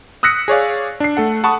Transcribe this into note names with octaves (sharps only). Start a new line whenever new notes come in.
D#6 E6 F#6 A#6 B6 C#7
G#4 C#5 D5 F5
D4 C7
A3 A4 F#5
F#5 A5 B5 C#6 D#6